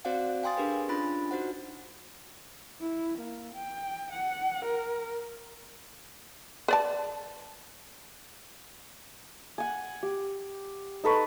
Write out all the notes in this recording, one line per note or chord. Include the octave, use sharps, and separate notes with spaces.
C4 F#4 C5 D5 F5 F#5
F5 G5 G#5 C6 D#6 A6
D4 G4 G#4 A#4 B4
C#4 D4 F4 B5 A6
D#4 F#4 C5 F#5
E4
A#3
G5
F#5
A#4
B4 D5 A5
F#5 G#5
G4
D#4 A4 B4 C#6